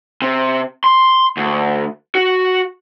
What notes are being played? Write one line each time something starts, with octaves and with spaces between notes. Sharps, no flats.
C3
C6
D2
F#4